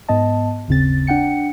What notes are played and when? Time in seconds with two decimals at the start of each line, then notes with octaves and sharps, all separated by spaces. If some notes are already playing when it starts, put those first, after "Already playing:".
0.09 G#2 B3 D#5 A5
0.68 G1 D#2 C#3 C4 A6
1.07 D4 F#5 G5 C#7